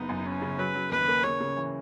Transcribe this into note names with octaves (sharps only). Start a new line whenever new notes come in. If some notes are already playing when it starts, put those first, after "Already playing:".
Already playing: F#1 B3 D#4
F#2
B3 C#4
C#3
F#3 B4
F#3
D#2 B4
A#3
C#3 C#5
C#3
E3